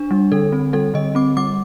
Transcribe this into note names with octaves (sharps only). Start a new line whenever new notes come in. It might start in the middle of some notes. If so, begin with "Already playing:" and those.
Already playing: D4
G3
D3 A4
C4
G3 A4
D3 D#5
C4 D6
G3 D6